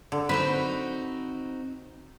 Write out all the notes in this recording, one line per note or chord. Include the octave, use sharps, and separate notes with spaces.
D3
C4 D#4 F#4 B4